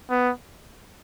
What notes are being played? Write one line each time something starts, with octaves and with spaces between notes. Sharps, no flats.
B3